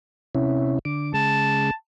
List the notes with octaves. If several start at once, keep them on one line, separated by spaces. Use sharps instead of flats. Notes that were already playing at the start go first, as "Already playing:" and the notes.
C3 C#4 E4
D3 D6
C#3 G#3 A5